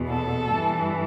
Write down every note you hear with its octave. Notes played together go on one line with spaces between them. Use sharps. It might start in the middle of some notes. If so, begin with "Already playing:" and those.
Already playing: E2 B2
A4
G2 E3